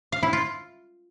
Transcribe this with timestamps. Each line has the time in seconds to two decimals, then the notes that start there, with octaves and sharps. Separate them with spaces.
0.12 F5
0.23 E4
0.33 F4